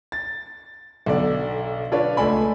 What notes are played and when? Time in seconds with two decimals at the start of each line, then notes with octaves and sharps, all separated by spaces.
0.12 A6
1.06 B1 D3 D5
1.92 D4 F4 B4 C#5 D5
2.17 C#2 A3 D5 G#5 B5